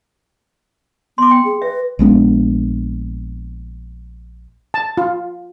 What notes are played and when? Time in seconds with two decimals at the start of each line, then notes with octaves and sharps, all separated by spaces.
1.18 B3 C6 D6
1.31 G5
1.45 G#4
1.62 B4 E5
1.99 A#1 G#3 B3 D4
4.74 A5
4.97 F4